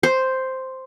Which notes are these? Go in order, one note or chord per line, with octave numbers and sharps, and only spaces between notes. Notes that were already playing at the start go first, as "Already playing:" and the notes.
C5